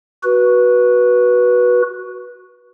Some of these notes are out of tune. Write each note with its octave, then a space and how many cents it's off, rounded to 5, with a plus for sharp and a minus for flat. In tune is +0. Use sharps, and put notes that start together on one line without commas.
F#4 +0 B4 -15